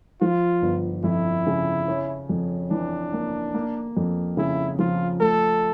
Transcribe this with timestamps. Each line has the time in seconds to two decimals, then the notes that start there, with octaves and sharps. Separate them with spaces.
0.21 F3 F4
0.62 G1
1.04 F2 E4
1.47 C#3
1.88 C#4
2.29 F2
2.71 E3 D4
3.13 A#3
3.54 A#3
3.97 F2
4.37 C#3 E4
4.79 F3 F4
5.20 A3 A4